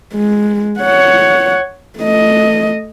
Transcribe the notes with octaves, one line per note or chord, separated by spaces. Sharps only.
G#3
C#5 F#5
A3 D#5